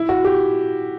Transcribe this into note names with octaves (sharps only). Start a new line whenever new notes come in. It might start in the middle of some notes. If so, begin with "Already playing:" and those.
Already playing: E4
F#4
G4